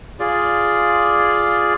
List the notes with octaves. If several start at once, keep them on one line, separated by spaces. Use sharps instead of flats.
F4 G#4 D5